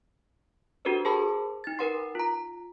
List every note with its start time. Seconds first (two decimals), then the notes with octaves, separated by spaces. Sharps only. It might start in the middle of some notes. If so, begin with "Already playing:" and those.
0.85 D4 F#4 G4 A4 B4 C5
1.05 G#4 A#4 C5 A5 B5 D6
1.64 D#4 A6
1.78 D#4 A#4 B4 F#5 C6 C7
2.15 F4 A#5